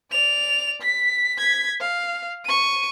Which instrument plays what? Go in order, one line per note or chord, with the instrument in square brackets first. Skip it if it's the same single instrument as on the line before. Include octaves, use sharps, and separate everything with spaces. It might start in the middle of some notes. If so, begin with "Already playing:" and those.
[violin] D5 F7
B6
G#6 B6
F5
C#6 D#7